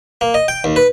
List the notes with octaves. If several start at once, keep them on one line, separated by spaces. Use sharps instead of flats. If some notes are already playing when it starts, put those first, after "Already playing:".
A#3
D#5
G5
D#2
B4